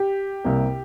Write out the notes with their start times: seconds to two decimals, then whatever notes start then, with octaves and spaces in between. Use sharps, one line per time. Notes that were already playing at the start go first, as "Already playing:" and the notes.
Already playing: G4
0.44 C2 C3 A#3